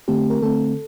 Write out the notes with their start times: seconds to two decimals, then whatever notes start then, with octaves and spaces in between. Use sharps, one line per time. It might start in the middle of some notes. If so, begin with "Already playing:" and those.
0.08 D3 A3 C4 G4
0.30 A#4
0.42 D3 A3 C4 A4